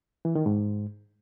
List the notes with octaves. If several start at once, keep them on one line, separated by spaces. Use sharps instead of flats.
E3
D#3
G#2